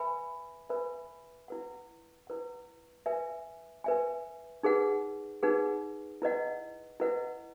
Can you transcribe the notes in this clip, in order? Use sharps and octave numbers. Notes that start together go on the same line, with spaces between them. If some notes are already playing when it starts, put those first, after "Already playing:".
Already playing: B4 E5 G#5 B5
B4 E5 G#5 B5
E4 B4 F#5
E4 B4 F#5
B4 E5 G#5
B4 E5 G#5
D#4 G#4 B4 F#5
D#4 G#4 B4 F#5
E4 B4 D#5 F#5
E4 B4 D#5 F#5